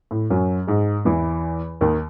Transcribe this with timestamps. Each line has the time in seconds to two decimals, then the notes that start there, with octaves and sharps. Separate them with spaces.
0.11 A2
0.30 F#2 F#3
0.67 G#2 G#3
1.05 E2 E3
1.81 D#2 D#3